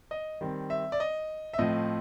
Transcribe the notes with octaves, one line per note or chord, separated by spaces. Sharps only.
D#5
D#3 G3 C4
E5
D5
D#5
E5
A2 F3 A3 C4 D#5